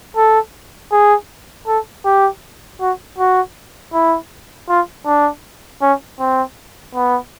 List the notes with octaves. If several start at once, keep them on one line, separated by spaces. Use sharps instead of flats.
A4
G#4
A4
G4
F#4
F#4
E4
F4
D4
C#4
C4
B3